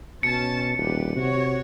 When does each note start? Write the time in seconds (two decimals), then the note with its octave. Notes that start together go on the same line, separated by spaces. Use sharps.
0.23 B2 C#4 A5 C#7
0.78 D#1 G4 B4
1.16 C3 F#4 C#5